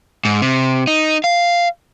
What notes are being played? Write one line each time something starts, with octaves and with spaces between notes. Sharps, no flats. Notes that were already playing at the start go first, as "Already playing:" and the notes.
G#2
C3
D#4
F5